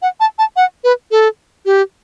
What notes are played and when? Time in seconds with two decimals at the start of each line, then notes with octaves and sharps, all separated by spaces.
0.02 F#5
0.20 A5
0.39 A5
0.56 F#5
0.84 B4
1.11 A4
1.66 G4